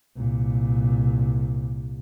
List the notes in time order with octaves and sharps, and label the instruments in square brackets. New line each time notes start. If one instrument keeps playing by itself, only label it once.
[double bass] C2 A#2